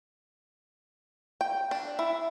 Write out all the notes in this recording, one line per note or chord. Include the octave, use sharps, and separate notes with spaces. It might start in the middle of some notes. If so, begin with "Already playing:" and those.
G5
D4
E4